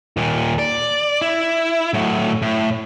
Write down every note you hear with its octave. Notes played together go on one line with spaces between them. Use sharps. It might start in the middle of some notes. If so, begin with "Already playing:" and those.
D#2 A#2
D5
E4
A2 F#3
A2